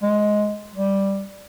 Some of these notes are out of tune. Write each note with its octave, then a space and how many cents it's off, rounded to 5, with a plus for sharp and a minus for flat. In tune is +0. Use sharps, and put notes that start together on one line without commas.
G#3 +10
G3 +0